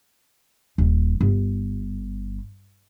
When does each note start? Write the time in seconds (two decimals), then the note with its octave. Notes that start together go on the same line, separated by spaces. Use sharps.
0.78 D#1
1.21 G1